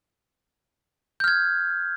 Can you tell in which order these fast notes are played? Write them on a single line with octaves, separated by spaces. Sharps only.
G6 F6 G#6